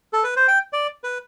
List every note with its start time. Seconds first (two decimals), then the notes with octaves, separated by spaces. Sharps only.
0.13 A4
0.23 B4
0.36 C5
0.48 G5
0.73 D5
1.04 B4